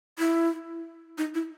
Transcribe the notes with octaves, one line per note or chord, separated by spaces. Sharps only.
E4
D#4
E4